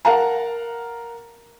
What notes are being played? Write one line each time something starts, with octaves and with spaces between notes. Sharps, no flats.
A#4 F5 F#5 A5 A#5